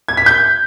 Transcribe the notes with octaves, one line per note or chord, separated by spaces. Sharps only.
G#6
B6
G6